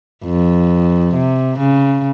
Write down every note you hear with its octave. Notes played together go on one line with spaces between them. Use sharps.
F2
C3
C#3